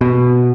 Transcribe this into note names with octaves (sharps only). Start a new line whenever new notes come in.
B2